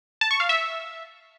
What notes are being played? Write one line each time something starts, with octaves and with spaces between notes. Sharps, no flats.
A5
C#6
F5
E5